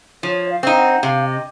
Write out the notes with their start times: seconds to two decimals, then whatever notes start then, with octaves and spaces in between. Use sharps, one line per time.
0.23 F3 C#5
0.50 F5
0.63 C4 D#4
0.76 F#5
1.03 C3 F5
1.23 D#5